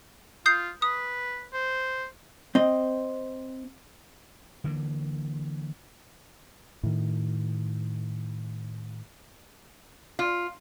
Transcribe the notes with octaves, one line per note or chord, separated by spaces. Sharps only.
F4 D#6 G6 C7
B4 D#6
C5
C4 D#5
D3 E3 A#3
A2 D#3
F4